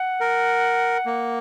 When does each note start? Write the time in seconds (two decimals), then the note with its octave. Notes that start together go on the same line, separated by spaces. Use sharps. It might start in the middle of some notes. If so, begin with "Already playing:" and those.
Already playing: F#5
0.21 A#4
1.06 A#3